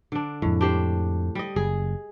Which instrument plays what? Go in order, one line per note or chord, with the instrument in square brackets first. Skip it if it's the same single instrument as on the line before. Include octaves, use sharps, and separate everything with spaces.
[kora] D3 D4
[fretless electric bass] F2 G#3 [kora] A2
[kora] D4 G4 C5
G3 D#5
[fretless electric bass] F#1 [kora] G#4